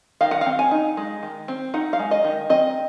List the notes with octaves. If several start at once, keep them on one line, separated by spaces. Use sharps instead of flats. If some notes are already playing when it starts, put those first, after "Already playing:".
D#3 F5
F#5
C4 F5
G#5
D#4
G#3
D#3
C4
D#4 F#5
F5
G#3
D#5
D#3
C4 D#5